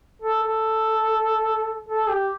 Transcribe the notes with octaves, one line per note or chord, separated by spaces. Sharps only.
A4
A4
A4
G4